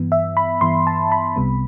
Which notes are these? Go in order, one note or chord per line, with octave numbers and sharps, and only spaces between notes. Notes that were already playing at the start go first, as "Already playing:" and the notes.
Already playing: G2 E3 B3
E5
B5
G2 E3 B3 C6
A5
B5
C2 C3 G3 B3